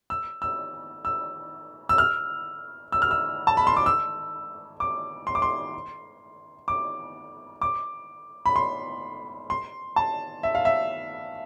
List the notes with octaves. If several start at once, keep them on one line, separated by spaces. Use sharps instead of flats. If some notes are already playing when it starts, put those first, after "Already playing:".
E6
E6
E6
E6
F6
E6
F6
E6
A5
B5
C6
D6
E6
D6
C6
D6
C6
D6
D6
B5
C6
C6
A5
E5
F5
E5